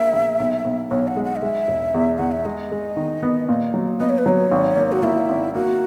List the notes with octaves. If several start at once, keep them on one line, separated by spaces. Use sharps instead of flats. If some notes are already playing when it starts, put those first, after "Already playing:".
Already playing: A#1 A#3 E5
A#1
B1
B1
B1 C#5
F#5
G#3
F#5
D#5
G#3 E5
E1
E2
E2 F#5
E5
G#3 D#5
G#3
D#3
B3
A#2
F#3
B3 D#5
C#5
B4
F#3 C#5
G#1
A#3
F#4
A#3 E4
G#1
A#3 F#4